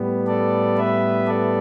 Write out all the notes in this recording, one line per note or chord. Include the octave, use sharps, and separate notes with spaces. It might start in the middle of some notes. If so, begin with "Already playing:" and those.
Already playing: A2 G3 B3
A4 D5
B4 E5
A4 D5